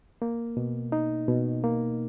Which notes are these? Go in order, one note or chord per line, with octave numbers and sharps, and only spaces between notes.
A#3
B2
D#4
B2
A#3